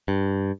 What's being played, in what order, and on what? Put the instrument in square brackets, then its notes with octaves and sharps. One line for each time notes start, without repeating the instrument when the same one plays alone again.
[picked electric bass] G2